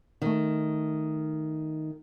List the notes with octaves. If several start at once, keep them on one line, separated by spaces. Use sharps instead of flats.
D#3 A3